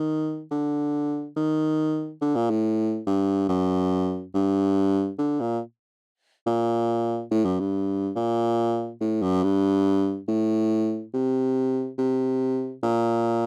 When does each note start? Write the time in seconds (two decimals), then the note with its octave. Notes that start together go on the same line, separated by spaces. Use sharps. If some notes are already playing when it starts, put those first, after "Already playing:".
Already playing: D#3
0.51 D3
1.37 D#3
2.22 D3
2.35 A#2
2.50 A2
3.06 G2
3.49 F#2
4.34 G2
5.18 D3
5.40 A#2
6.47 A#2
7.31 A2
7.45 F#2
7.60 G2
8.16 A#2
9.01 A2
9.22 F#2
9.43 G2
10.28 A2
11.14 C3
11.98 C3
12.83 A#2